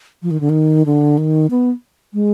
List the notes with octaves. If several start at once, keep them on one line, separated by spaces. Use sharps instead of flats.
F3
D#3
D3
D#3
D3
D#3
B3
G#3